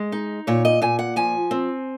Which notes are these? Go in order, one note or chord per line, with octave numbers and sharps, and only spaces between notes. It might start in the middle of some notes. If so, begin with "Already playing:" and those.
Already playing: G#3
D#4
A#2 C#5
D#5
A#2 G#5
F#5
F3 G#5
C4